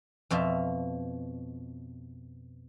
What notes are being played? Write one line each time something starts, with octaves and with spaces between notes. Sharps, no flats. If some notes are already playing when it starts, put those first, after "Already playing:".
F2 B2 F4 E5